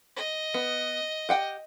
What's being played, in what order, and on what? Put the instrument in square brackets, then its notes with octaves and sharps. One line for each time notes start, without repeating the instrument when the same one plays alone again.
[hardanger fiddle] D#5
[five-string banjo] B3
G4 F#5 G5